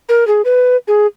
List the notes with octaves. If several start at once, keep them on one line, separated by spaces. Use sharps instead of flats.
A#4
G#4
B4
G#4